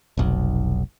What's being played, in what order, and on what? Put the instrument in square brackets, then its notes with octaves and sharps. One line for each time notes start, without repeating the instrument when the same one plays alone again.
[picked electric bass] F1 B1